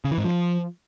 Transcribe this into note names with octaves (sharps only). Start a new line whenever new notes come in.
C#3
E3
G#2
F3